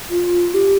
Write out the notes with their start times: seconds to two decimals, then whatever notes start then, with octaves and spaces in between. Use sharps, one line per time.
0.11 F4
0.54 G4